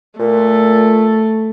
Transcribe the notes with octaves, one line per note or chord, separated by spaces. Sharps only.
A#2 A3